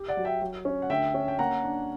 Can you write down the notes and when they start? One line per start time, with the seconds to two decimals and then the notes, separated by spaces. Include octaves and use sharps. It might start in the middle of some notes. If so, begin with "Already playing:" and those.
Already playing: G4
0.08 D5 F#5
0.17 F#3
0.25 E5 G5
0.42 F#3
0.65 C#4
0.82 F#5
0.89 D2 E5 G5
1.14 C#4
1.28 G5
1.39 A#3 F#5 A#5
1.64 D4